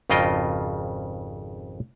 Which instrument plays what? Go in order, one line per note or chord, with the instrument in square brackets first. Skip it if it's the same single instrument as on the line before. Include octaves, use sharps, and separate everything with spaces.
[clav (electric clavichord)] G#1 F2 C#3 F4 D#5 G5